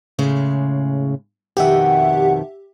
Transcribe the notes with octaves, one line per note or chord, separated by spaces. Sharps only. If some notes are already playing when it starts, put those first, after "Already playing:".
A2 C#3 G#3
F2 B2 D#3 G4 E5 F#5